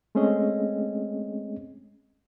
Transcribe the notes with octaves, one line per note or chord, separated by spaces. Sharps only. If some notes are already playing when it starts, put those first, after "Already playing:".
G#3 A3 C4 C#4 G#4 D#5